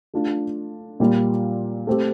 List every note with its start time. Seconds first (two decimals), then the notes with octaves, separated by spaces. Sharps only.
0.14 A3 D4 F4
1.00 A#2 G3 A#3 F4
1.87 A3 C4 G4